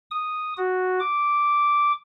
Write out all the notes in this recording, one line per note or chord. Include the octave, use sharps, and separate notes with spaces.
D#6
F#4
D6